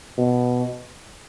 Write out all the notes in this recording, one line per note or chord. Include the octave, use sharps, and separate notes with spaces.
B2